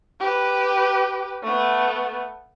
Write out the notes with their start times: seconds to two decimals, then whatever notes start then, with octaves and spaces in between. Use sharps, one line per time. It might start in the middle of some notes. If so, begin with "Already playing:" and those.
0.20 G4 B4
1.43 A3 B3